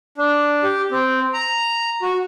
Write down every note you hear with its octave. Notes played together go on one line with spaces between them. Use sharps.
D4
G4
C4
A#5
F#4